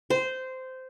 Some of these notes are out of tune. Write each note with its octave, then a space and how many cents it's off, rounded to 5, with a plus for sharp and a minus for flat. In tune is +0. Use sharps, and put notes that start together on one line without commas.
C5 -15